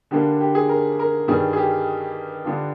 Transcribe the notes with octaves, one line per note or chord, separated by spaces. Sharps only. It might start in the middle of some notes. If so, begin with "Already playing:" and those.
D3 G3 A#3 D4 G4
G4
G#4
A#4
A#4
G2 D#3 G3 G#4
G#4
G4
D3 G3 D4 F4